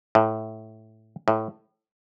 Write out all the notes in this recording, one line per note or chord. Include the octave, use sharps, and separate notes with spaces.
A2
A2